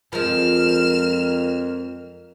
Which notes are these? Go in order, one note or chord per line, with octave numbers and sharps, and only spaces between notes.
F2 F3 G#3 A#4 F6 E7